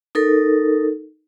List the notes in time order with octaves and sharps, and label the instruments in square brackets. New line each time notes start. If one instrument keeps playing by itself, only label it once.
[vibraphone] D#4 A4 A#4